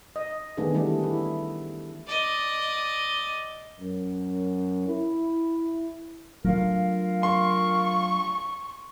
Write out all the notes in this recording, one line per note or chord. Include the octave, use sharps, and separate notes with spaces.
D#5
D#3 A3 B3 D4 G#4
E3 G3 A3 D4
A3 E4
D5 D#5
F#2
E4
F#3 A3 D4 F4 A#4 F5
C6 C#6